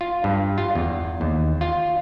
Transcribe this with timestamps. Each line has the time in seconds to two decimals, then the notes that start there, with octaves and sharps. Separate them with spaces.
0.01 F4
0.24 G2
0.58 F4
0.75 E2
1.21 D#2
1.61 F4